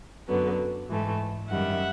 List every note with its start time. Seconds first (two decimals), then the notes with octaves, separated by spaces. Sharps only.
0.27 F#2 D3 F#3 B3
0.89 G#2 E3 A3
1.49 F#2 D#3 G3 E5 F#5